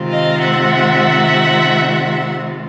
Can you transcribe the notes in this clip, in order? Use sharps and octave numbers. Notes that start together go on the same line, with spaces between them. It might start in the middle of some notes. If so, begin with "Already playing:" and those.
Already playing: C3 D#3 G#3 C4 F4
D#5 F5
E5 F#5